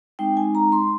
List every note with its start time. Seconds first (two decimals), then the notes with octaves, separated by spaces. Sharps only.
0.19 G#3 C4 D#4 G5
0.37 G#5
0.55 A#5
0.72 C6